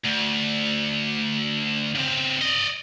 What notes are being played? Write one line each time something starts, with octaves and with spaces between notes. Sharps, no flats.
D2
C#3 C4
D5 D#5